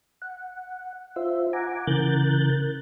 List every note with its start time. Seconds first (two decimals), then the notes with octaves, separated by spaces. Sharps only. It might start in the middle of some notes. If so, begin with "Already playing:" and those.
0.22 F#5
1.16 F4 C5 E5
1.53 F#5 G#5 A#5 D6
1.87 C#3 E3 A#4 F#6 G6 A6